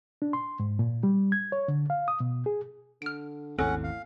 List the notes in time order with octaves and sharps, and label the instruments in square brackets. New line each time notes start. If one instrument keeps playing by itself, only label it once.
[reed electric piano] D4
C6
G#2
A#2
G3
G#6
C#5
D3
F5
D#6
B2
G#4
[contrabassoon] D3 [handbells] F6 D7
[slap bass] G#1 D#2 C4 [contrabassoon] A2 [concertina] C#4 F#5 [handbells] G#4 A4
[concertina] F5